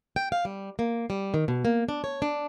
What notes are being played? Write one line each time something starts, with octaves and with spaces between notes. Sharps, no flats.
G5
F5
G3
A#3
G3
D#3
B2
A#3
D4
C#5
D4